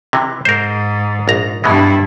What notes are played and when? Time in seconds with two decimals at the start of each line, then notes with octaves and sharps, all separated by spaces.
0.13 C3 E3
0.45 G#2 A#4 C5
1.28 A#1 A#5
1.64 G2 B2 E3 G#3 E4